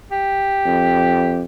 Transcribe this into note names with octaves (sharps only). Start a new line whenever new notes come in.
G4
F2